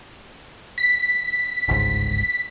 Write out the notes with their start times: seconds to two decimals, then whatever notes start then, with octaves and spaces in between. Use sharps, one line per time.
0.78 B6
1.68 G1 C#2 G#2